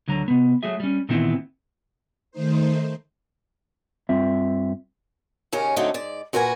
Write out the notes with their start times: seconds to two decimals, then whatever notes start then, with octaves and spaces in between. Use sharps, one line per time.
0.08 D2 D3 F#3 A#5
0.28 C3 B3
0.63 F#3 A3 F#4 G#4 E5
0.80 G3 C#4
1.09 A#2 D#3 E3 B3 C4 E4
2.31 D#3 A3 D#4 C5
4.09 G2 C4 F4 E5
5.52 D#2 C#3 C#4 A#4
5.76 D3 F#3 A3 C4 D#4
5.94 G#2 D5
6.33 A#2 F#4 A#4 B4 G#5